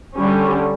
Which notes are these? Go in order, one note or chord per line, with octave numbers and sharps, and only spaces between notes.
D3 G3 C#4